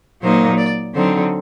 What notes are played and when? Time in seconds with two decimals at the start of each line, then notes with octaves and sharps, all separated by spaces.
0.22 A#2 F#3 A#3 D#4 C5
0.58 D5
0.94 D3 F#3 C4 D#4 C5